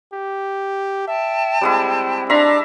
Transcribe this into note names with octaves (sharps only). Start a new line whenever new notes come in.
G4
E5 G5 A5
G3 G#3 C4 E4
D4 E5 A5 A#5 C6 D6